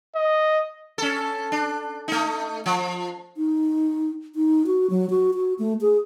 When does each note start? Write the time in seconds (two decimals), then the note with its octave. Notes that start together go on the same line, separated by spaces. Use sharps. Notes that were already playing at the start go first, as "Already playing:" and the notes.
0.16 D#5
0.98 C#4 A4
1.52 D4
2.08 A3 D#4
2.66 F3
3.37 D#4
4.35 D#4
4.67 F#4
4.90 F#3
5.10 F#4
5.34 F#4
5.59 A3
5.81 G#4